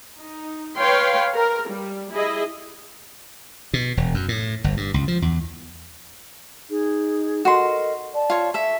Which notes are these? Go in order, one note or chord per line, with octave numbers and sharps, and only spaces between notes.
D#4
B4 C#5 F5 G5 C6
A#4
G3
E4 G#4 D#5
B2
E1
F#2
A2
G1
G2
C#2
F3
E2
D#4 G#4
F#4 A4 A#4 D#5 C6
D5 A5
F4 C#5
A4 E5 C#6